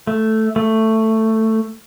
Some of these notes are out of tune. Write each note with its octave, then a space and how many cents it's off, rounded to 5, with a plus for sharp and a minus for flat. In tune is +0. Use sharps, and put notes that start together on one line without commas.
A3 +0
A3 +10